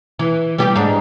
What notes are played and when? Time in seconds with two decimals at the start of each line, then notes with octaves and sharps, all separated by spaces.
0.19 E3
0.58 G3 B3 G4
0.76 G#2 D4